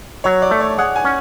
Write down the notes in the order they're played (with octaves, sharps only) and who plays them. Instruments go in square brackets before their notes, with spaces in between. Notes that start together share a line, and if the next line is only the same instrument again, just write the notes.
[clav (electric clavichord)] F#3 [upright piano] C#5
[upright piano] D5
[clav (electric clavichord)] A3
[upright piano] C#5
[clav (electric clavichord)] G#4 [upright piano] F#5
[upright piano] G#5
[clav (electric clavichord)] C#4